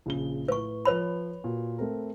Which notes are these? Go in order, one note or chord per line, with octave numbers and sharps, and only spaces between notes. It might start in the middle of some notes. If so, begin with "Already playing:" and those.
A#1 C#3 G7
A2 B4 C#6
F3 B4 C#5 B5 F7
A#2 F#4
A3 C4 A#4